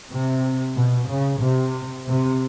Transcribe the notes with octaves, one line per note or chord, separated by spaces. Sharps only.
C3
B2
C#3
C3
C3